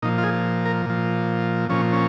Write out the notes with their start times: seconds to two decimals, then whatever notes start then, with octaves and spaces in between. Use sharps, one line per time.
0.02 A#2 D#4
0.05 F3
0.18 F4
0.23 G#4
0.66 A#4
0.86 A#2 F3
1.69 A#2 F3 C#4
1.93 C#4